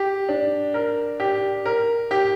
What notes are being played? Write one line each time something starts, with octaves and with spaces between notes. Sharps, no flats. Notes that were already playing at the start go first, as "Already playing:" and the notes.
Already playing: G4
D4
A#4
G4
A#4
G4